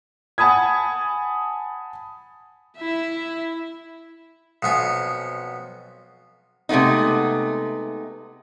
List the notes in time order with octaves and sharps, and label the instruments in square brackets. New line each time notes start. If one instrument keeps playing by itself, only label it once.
[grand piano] F#5 G#5 A5 B5 D#6 G#6
[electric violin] E4 E5
[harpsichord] B1 F2 B3 G#5
[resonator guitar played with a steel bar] C3 G#3 A3 B3 D#4